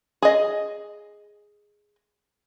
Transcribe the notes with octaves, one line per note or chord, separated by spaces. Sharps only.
G#4 D#5